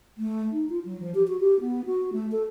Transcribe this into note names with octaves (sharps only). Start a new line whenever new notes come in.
A3
D#4
F4
F#3
F3
G4
F#4
G4
B3
F#4
A3
A4